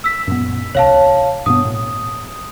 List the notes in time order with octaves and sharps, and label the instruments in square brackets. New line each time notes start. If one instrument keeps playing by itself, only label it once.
[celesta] E6 B6
[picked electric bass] F#2 A#2 B3
[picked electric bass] D1 C2 [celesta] C#5 F5 A5
[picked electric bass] G2 B2 B3 [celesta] D#6
[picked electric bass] A2